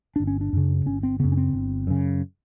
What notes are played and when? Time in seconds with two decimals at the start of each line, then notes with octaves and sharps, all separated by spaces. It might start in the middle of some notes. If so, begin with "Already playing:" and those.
0.16 G1 D4
0.27 C#4
0.41 D4
0.53 F#2 C#3
0.86 G1 C#4
1.03 C4
1.20 F#2 C#3 B3
1.32 C#4
1.37 C4
1.53 G1
1.87 F#2 C#3